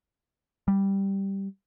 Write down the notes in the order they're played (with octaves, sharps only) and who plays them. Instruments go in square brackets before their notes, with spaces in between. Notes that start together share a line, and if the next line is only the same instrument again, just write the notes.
[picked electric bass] G3